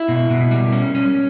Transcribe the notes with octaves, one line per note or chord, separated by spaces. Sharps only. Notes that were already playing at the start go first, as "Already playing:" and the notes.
Already playing: E4
B2
B2
G3
C#4
C#4